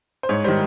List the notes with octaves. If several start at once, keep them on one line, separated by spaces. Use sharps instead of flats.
C5
G#2 C#5
D#3 G3 C5